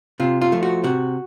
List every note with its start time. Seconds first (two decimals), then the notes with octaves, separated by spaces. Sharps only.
0.20 C3 F4
0.41 F4
0.52 F3 A3
0.63 F#4
0.84 C3 F#4